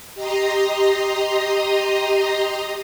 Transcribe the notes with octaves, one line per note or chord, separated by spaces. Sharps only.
G4 D#5 A#5 C6 D#6